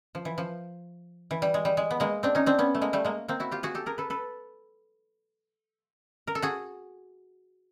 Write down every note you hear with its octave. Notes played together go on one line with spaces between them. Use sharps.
F3
E3
F3
E3
G3
G#3
G3
G#3
B3
G#3 A#3
C4 D4
C#4 D#4
C4 D4
B3 C#4
A3
G#3 A#3
G3 A3
G#3 A#3
A#3 C4
E4 F#4
F4 G4
F#4 G#4
G4 A4
G#4 A#4
A4 B4
A4 B4
A#4
A4
F#4 G#4